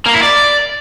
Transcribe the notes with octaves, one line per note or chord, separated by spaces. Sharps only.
A#3
E4
D5